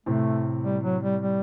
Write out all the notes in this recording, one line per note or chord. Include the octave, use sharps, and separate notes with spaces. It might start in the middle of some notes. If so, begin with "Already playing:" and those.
A2 C3 A3
G3
F#3
G3
G3